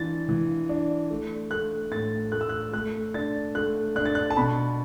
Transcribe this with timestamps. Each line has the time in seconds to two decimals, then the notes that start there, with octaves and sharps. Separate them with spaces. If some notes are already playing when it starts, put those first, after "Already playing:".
Already playing: E3 D4 A6
0.29 E3
0.69 D4
1.10 A3
1.51 A3 F#6
1.92 A2 A6
2.32 A3 F#6
2.41 E6
2.49 F#6
2.73 A3 F#6
3.14 D4 A6
3.55 A3 F#6
3.96 D4 F#6
4.05 A6
4.15 F#6
4.30 A5
4.37 B2 B5